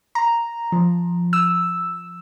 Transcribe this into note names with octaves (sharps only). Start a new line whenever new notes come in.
A#5
F3
E6